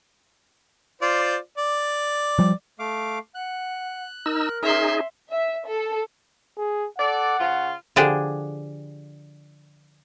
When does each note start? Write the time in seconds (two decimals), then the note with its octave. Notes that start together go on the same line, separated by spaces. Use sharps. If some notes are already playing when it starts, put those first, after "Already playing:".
1.02 F4 C5 D5
1.58 D5
2.39 F3 G3
2.79 A3 F5 D6
3.35 F#5 F#6
4.26 D#4 A#4 E6
4.63 C#4 D#4 G#4 E5 C6
5.31 E5
5.66 A4
6.58 G#4
6.98 A4 D5 F#5
7.39 C#3 F4
7.96 D3 F3 D4 G4 G#4